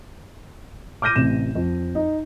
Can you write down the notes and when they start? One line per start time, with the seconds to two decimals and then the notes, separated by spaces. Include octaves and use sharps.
1.02 D6 F6 G6 A#6 D#7
1.16 A1 C3 E7
1.55 F2
1.95 D#4